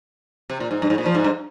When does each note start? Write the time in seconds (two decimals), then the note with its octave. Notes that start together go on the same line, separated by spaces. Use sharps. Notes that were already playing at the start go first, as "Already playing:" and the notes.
0.50 C3
0.60 A#2
0.71 G#2
0.82 G2
0.90 G#2
0.98 A#2
1.06 F3
1.15 G#2
1.24 G2